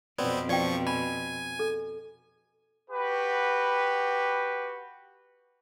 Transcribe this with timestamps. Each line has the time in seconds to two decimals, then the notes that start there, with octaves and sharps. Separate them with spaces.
0.18 F2 B2 B3 C4 D5
0.49 F3 D5 G5 C#6
0.87 G#5 B5
1.59 A4
2.91 F#4 G4 B4